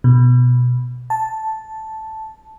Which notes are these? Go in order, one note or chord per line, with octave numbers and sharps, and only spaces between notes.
B2
A5